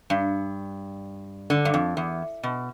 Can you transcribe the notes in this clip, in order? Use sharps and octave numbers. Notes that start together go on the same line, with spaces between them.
G2
D3
G2
F2
E2
B2